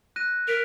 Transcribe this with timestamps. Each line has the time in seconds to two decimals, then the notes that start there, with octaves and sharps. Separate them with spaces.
0.16 F#6 A#6 D#7
0.47 A#4 B6 D7 F7